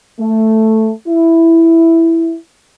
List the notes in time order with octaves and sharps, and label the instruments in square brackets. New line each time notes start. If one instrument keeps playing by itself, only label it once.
[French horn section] A3
E4